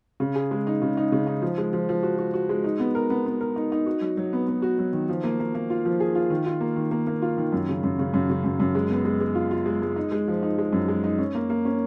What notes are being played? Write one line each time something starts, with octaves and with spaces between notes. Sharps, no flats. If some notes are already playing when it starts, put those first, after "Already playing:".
C#3
G#4
G#3
D#4
C#3
D#4
C#3
D#4
F3
G#3
F3
F3
F#4
F#4
F#4
G#3
D#4
B3
A#4
B3
B3
A#4
D#4
D#4
F#4
F#3
F#3
B3
B3
F#4
F#3
D#3
F3
A#3
A#3
A#3
F4
F3
G#4
F4
D#3
F4
A#3
D#3
A#3
A#3
F4
D#3
F#2
C#3
F#2
C#3
F#2
C#3
F#2
F#2
G#3
B3
G#3
G#3
F4
F4
G#3
G#3
D#4
G#3
F3
D#4
G#3
F#2
G#3
D#4
C#4
A#3
A#3
C#4